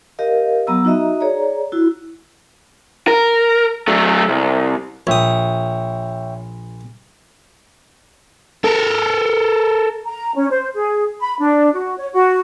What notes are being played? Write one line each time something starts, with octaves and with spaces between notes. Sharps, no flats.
G4 A#4 D#5 F5
F#3 B3 A#5 E6
D#4 F#4 D#5 E5 A#5
G#4 C#5 D5 A#5
E4 F#4
A#4
F#3 A3
C2
A#1 C#5 E5 G5 D#6
A4 A#4
A#5
C#4
C5
G#4
B5
D4
F#4
C#5
F#4